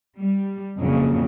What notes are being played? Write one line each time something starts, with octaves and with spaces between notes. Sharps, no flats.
G3
F2 A#2 C#3 F#3